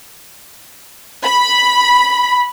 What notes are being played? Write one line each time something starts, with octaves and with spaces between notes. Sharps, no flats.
B5